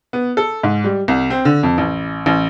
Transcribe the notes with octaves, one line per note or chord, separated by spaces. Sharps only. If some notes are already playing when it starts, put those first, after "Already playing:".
B3
A4
G#2
G3
C2
C4
D3
F2
A1
A1